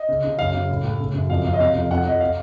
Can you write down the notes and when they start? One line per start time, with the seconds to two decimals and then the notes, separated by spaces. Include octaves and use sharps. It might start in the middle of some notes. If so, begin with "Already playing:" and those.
Already playing: D#5
0.09 C#3
0.24 C#3
0.39 F#2 F5
0.54 C#3
0.70 A2
0.84 A2
1.00 C#3
1.14 F#2
1.29 F2 F5
1.45 F2 F5
1.53 D#5
1.60 C3 F5
1.75 F2
1.90 F2 F#5
2.06 F2 D#5
2.20 F5